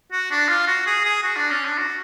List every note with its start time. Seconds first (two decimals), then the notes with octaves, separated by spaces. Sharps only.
0.12 F#4
0.31 D4
0.49 F4
0.68 F#4
0.87 G#4
1.05 G#4
1.23 F#4
1.37 D4
1.51 C#4
1.65 D4
1.78 F#4